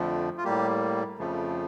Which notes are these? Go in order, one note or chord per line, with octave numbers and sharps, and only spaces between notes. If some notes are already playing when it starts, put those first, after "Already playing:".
Already playing: F2 D3 F3 A3
F4
A2 G3 A#3 G4
F2 C#3 F3 A3